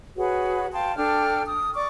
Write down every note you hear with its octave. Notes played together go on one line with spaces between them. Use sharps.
F#4 G#4 B4 C#5
F5 G5 A5 C6
D4 A4 G5 F6
D#6
D5 C#6 D6